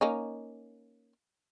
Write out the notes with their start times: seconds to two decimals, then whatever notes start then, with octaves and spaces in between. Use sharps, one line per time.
0.01 A#3 C#4 D#4